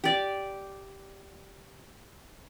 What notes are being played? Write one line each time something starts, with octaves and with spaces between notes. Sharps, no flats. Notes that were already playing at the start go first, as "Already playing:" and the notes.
G4 D5